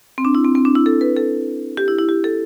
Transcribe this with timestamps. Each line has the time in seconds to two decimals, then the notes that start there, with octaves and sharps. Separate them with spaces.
0.18 C4
0.25 D4
0.35 E4
0.45 C4
0.55 C4
0.65 D4
0.75 E4
0.86 A4
1.01 B4
1.17 A4
1.77 G4
1.88 E4
1.98 E4
2.09 G4
2.24 A4